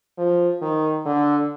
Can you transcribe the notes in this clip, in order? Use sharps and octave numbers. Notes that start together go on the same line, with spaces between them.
F3
D#3
D3